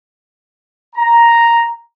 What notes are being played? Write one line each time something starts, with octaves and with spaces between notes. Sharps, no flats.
A#5